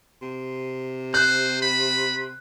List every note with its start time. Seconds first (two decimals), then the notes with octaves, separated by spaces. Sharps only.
0.22 C3
1.14 C5 F#6
1.62 B5